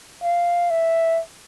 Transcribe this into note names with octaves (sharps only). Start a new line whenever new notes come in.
F5
E5